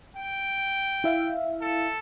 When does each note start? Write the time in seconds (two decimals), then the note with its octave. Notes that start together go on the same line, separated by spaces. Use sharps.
0.17 G5
1.04 E4 E5 F5
1.62 A4